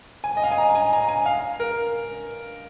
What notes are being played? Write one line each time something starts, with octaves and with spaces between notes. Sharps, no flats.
G#5
D#5
F5
G#5
A#5
G#5
A#5
G#5
F5
A#4